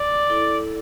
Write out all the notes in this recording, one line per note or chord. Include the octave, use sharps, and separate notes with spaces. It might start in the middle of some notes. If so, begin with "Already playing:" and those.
Already playing: D5
E4 A4